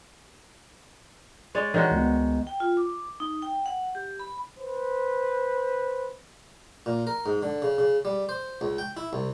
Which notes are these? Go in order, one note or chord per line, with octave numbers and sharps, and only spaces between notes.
G#3 C#5 D5
D#3 E3 G#3 F#4 C#5
C#2 B3
G5
F4
D6
D#4
G5
F#5
G4
B5
B4 C5
A#2
A#4
G#2
D3
C#3
C#3
G3
C5
C#2
G5
E4
C2